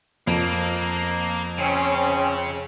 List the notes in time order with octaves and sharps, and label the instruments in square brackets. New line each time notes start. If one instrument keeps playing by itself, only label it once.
[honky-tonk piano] F2 [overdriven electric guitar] A#3
[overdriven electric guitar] C#3 [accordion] C4 C#4